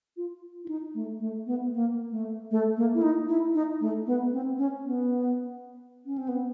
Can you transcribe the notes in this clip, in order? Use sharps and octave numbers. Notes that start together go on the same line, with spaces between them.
F4
E4
D#4
A3
A3
B3
A#3
A3
A3
A#3
E4
D#4
E4
D#4
A3
B3
C4
C#4
B3
C#4
C4
B3